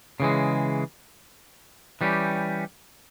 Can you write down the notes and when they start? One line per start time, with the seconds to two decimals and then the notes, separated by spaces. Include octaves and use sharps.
0.20 C#3 E3 G#3
2.01 E3 G3 C#4 G4